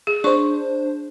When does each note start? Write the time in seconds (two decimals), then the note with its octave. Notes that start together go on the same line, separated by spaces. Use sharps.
0.07 G#4
0.24 D4 C5 C#6